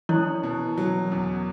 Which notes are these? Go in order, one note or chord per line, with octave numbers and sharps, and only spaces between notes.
E3 C#4 E4
B2
F#3
E2